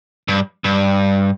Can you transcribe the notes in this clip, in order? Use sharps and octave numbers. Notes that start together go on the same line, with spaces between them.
G2
G2